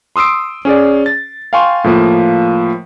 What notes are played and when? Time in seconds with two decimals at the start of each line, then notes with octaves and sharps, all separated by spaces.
0.16 C6 D#6 E6 C7 D7
0.65 C#4 G#4 D5
1.06 A6
1.53 F5 G5 G#5 C6 C#6
1.84 A2 F3 A#3